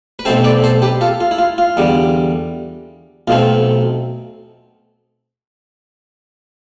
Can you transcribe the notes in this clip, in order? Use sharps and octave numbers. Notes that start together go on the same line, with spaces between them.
B4
B1 B2 A3 C4 A4 C5
B4 D5
A4 C5
G4 B4
F4 A4
F4
E4
F4
F4
E2 D3 G3
B1 B2 A3 C4 F4